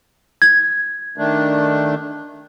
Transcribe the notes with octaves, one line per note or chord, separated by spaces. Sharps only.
G#6
D#3 A3 D4